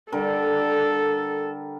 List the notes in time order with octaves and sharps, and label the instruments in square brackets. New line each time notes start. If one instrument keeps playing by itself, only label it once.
[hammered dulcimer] D3 G3 A#4 [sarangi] A4